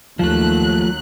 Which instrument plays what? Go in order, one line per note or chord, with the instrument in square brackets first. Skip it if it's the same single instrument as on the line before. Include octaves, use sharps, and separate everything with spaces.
[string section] D#2 F#3 F#6 [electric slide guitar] F3 A3